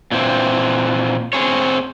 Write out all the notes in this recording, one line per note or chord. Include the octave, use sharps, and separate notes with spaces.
A#2 E3 C4
C4 G#4 C#5